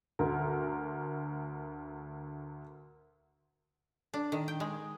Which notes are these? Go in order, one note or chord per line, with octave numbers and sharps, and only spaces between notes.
D2 A#4
D4
D#3
G5
G#3